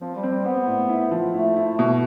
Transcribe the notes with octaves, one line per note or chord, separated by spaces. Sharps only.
F3 C4
G3
C4
G3
B3 C4
A2
E4
F3
A3 E4
E4
B2